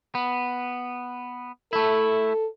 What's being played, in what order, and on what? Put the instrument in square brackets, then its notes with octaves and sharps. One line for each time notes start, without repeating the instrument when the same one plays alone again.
[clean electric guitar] B3
[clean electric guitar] A3 E4 [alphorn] A4